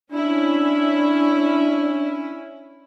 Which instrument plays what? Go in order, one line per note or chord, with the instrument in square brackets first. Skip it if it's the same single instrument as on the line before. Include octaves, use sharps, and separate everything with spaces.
[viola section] C#4 E4 [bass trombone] D4